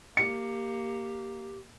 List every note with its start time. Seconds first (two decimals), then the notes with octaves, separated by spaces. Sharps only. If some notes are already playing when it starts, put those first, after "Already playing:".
0.17 A#3 G4 C#7